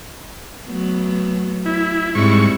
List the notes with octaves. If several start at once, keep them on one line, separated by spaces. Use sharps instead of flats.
F#3 A3 B3
E4
G#2 G3 C4 E4 C#6